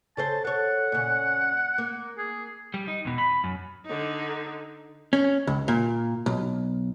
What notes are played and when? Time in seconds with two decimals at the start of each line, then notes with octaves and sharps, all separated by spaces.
0.17 C#3 A4 C5 A5
0.45 A4 C#5 F#5
0.92 A#2 C#3
1.78 A#3
2.18 G#4
2.74 G3
2.88 D#4
3.05 E2 B2
3.18 B5
3.44 F#2
3.85 D3 D#4
5.13 C#4
5.47 C#2
5.68 A#2
6.26 B1